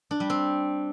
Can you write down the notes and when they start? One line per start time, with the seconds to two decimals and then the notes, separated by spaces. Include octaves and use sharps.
0.11 D4
0.20 G3
0.30 C4